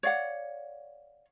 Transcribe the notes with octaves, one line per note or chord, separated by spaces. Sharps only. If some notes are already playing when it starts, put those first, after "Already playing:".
C#5 D5 F5 F#5